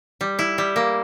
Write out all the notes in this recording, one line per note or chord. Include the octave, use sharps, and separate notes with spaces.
G3
E4
G3
A#3